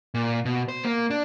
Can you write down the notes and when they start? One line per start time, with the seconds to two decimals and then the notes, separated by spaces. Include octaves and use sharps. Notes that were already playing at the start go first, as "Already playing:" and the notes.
0.14 A#2
0.45 B2
0.69 C5
0.85 A#3
1.10 D4